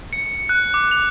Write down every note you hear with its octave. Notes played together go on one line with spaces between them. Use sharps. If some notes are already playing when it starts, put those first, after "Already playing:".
C#7
C#7
F#6
D6
F7